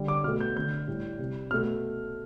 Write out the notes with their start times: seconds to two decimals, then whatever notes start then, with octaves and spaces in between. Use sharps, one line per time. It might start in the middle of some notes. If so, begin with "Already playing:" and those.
Already playing: D3 G3
0.08 D6
0.24 B2 F6
0.28 A3
0.40 G6
0.55 D3 A3 G6
0.88 A2 G3
1.19 C3 G3
1.51 B2 F6
1.54 A3